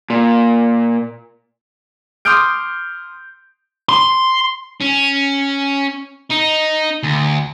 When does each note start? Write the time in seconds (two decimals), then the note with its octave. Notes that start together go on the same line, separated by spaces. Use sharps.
0.10 A#2
2.25 C6 D6 D#6 F6 G6 D7
3.89 C6
4.81 C#4
6.30 D#4
7.03 D2